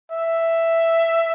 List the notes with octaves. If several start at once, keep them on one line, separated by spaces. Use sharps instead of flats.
E5